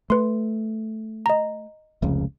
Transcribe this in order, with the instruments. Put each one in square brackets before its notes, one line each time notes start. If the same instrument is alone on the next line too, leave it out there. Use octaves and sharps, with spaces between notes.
[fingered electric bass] A3 [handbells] B4 C6
[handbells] D#5 A#5
[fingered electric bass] F1 C#2 C#3